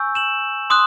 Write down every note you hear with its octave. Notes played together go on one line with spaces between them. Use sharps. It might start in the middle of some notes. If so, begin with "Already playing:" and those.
Already playing: G#5 C#6 E6 G6
E7 F#7
C6 D#6 F#6